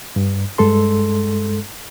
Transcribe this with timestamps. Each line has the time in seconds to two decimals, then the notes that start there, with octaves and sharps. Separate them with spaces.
0.16 G2
0.58 G2 G#3 A4 C6